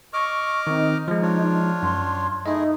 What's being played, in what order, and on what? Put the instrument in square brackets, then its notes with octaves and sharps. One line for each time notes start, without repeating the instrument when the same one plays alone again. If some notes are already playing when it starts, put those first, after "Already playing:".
[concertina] D#5 D6 F6 [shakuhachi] C#6
[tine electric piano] D#3 C4 [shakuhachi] D#4
[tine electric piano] F3 G#3
[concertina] D4 F4 C#5
[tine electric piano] F#2 [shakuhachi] C6
[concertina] A3 E4 G#4 [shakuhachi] D#4 [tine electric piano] D#5 E5